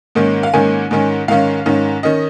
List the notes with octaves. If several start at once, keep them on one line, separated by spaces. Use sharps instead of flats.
G#2 D#3 A#3 C#4
F5
G#2 D#3 A#3 C#4 G#5
G#2 D#3 C#4
G#2 D#3 C#4 F5
G#2 D#3 C#4
D#3 C#4 D#5